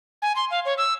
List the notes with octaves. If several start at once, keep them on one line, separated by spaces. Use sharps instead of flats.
G#5
C6
F5
C#5
E6